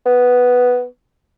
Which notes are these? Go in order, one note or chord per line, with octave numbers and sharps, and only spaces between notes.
B3